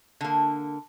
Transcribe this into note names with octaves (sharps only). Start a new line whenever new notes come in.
D3 A#3